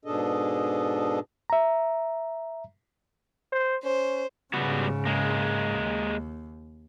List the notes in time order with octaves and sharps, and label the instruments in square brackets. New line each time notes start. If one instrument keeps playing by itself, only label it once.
[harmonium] G#2 B2 D4 G#4 A4 D#5
[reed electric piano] E5 A#5
[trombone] C5
[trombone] C#4 [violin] C5
[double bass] G#2 C#3 [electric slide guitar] G3 B3 F#4
[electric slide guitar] G#3 A#3
[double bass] D#2